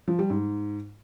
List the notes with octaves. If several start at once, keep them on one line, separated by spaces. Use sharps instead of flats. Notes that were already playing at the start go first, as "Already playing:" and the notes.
F3
G3
G#2